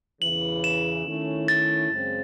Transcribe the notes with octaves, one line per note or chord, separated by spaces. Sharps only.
E2 C#3 E3 F#7
E7
D#3 A3 C#4 E4
A6
F#2 C#3 G#3 C4